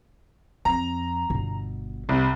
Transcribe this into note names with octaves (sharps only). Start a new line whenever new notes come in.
F2 A#5
G1 B2
C2